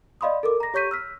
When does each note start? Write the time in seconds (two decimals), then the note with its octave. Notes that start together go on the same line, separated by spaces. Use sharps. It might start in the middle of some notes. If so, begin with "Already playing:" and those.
0.21 D5 D#5 F5 B5 C6 D#6
0.43 A4 A#4 D6
0.60 A#5 A#6
0.74 G4 C#5 C#6 G6 B6 D#7
0.91 E6 F6 B6